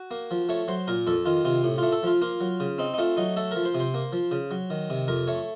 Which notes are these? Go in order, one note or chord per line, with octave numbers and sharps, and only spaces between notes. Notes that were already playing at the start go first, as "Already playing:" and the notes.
Already playing: F#4
A#3
F3
A3 C#5
F#3 C5
A#2 A#4
F2 A4
D#3 F4
C3 F4
A2
A3 F4
A4
F3 F4
A#3 F4
F#3
C#3
C4 D#4
D#4
A3 F4
F#3 D#4
A3 A4
F3 A#4
C5
C3
C5
A#3
F3
C#3
F#3
D#3
C3
F2 A#4
A3 C#5